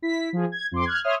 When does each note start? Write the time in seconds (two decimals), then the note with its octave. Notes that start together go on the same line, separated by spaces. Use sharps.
0.02 E4 B6
0.33 F3 G#4
0.52 G#6
0.71 F2 C6 D6
0.85 F6 F#6 G#6
1.04 C#5 E5 C6 D#6 F6